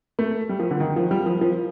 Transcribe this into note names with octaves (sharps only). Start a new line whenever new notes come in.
A3
G3
F3
D3
D#3
F3
G3
F3
F3